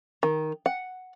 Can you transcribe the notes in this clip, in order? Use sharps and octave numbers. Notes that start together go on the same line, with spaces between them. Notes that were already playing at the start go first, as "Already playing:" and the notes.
D#3
F#5